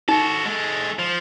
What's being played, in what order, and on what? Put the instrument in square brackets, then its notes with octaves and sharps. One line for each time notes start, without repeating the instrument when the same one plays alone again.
[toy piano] D#4 [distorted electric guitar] F#4 A4
[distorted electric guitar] G#3 A4
F3